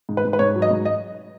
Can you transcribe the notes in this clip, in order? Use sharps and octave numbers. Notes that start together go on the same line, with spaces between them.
G#2
B4
G#2
B4
G#2 C#5
F#3
D#5
G#2
D#5